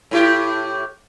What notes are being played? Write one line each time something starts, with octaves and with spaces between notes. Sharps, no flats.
A2 E4 G4